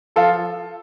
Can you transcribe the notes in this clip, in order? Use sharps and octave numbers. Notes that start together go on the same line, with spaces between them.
F3 F4 A4